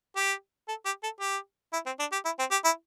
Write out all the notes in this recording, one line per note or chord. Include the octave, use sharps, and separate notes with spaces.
G4
A4
G4
A4
G4
E4
C4
D4
G4
E4
C4
G4
E4